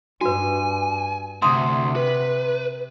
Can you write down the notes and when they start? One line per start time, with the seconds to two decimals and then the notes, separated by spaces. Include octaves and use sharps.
0.21 G2 F#4 B4 G#5
1.42 D2 C3 C6 D#6
1.96 B4